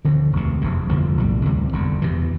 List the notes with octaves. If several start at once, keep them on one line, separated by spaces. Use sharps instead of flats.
D2 D3 F3 C4
E1 D2 C3
F1 E2 C3
G1 F2 D3 F3
B1 A2 G3
D2 C3 E3 G3
G1 F2 D3
E2 C3 E3